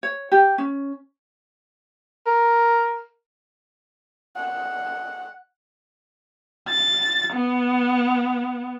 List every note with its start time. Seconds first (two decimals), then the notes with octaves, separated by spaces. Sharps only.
0.03 C#5
0.32 G4
0.58 C#4
2.27 A#4
4.36 F#5
6.69 A6
7.33 B3